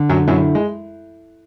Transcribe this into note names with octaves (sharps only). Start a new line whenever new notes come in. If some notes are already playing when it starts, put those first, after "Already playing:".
Already playing: D3
F#2 F#3
F#2 F#3 E4
G#3